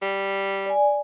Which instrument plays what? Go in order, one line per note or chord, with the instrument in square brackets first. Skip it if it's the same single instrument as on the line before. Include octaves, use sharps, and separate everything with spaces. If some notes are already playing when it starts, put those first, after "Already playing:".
[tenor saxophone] G3
[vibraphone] D5 G#5